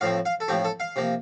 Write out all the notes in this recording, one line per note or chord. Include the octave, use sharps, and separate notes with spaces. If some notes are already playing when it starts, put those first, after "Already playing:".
A2 F3 C4 F5
F5
A4
A2 F3 C4 G4
A4
F5
C3 F3 A#3